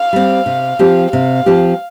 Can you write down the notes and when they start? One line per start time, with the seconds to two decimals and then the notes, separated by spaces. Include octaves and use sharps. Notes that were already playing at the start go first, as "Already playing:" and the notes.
Already playing: F5
0.13 G3 C4
0.46 C3
0.79 F3 C4 G4
1.12 C3 F5
1.46 F3 C4 G4